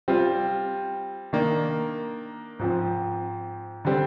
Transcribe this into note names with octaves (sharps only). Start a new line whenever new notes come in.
G3 C4 F4
D#3 A#3 D4
G#2 F3 C4
D3 G3 C4